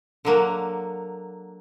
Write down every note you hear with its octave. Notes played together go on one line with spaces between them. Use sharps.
D3 F#3 A#3